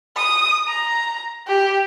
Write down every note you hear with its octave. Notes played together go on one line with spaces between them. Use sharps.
D#6
A#5
G4